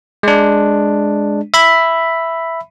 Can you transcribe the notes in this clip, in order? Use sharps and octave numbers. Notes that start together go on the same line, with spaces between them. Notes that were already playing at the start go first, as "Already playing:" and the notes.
G#3 D4
E5 B5